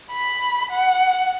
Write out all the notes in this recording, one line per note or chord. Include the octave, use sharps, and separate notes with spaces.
B5
F#5